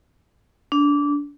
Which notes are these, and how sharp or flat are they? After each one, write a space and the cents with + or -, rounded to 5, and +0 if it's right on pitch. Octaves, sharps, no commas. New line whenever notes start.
D4 -20